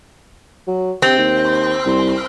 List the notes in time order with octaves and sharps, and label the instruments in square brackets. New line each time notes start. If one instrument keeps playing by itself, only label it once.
[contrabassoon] F#3
[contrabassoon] C3 [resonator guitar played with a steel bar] C4
[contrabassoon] D#2
C2